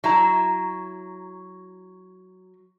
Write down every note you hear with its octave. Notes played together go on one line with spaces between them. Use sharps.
F#3 E4 A#5